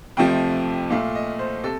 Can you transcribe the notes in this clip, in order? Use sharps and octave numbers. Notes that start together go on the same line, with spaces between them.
F2 C3 F3 A3 G5
A#2 A3 F5
D#5
C5
C3 A4